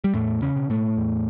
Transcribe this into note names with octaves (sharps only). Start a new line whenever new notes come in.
G3
E2 A2 A3
C#3 C#4
B2
A2 A3
E2